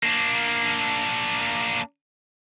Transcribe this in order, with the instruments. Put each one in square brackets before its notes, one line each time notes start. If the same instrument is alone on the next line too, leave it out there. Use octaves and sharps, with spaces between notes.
[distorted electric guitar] A#3 D4